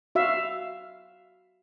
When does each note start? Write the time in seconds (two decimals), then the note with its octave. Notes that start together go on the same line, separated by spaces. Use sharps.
0.15 F#4 E5 F5